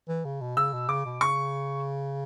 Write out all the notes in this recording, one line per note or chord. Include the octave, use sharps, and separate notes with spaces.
E3
C#3
B2
C#3 E6
B2
C#3 D6
B2
C#3 C#6